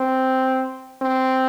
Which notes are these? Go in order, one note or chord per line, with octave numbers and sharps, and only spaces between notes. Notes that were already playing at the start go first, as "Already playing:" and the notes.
Already playing: C4
C4